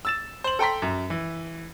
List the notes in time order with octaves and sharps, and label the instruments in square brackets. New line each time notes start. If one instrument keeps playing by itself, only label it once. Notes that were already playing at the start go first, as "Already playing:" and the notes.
[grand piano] E6 A6 E7
C5 F#7
A4 G5 A#5 C6 B6
F#2
E3